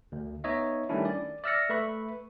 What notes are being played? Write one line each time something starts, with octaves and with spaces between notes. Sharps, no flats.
D2
B3 D#4 C#5 D#5 E5
D#3 G3 A3 C#4 D4 E4
D5
D5 E5 E6 F6 A#6 C#7
A3 B4 E5 B5 C#6